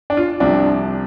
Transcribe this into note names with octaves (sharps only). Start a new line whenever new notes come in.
D4
F4
C2 C3 F3 D4